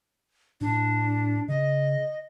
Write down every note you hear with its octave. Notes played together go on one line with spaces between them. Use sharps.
A2 D4
C#3 D#5